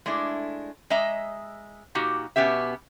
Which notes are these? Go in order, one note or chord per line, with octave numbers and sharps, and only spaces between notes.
G#3 A3 D4 E4
G#3 D#5 E5 A#5
A#2 D#4 F#4 G4
B2 B3 C#4 G4 E5